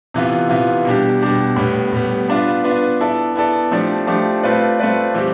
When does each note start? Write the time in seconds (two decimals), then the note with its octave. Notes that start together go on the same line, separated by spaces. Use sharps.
0.14 C3 E3 B3 F4
0.49 C3 E3 B3 F4
0.85 B2 G3 D4 G4
1.21 B2 G3 D4 G4
1.56 A2 G3 B3
1.92 A2 G3 B3
2.28 B3 D4 F4 B4
2.64 B3 D4 F4 B4
3.00 B3 E4 A4 D5
3.35 B3 E4 A4 D5
3.71 F3 A3 D4 G4 D5
4.07 F3 A3 D4 G4 D5
4.43 A3 C4 F4 B4 D5
4.79 A3 C4 F4 B4 D5
5.14 E3 G3 C4 E4 G4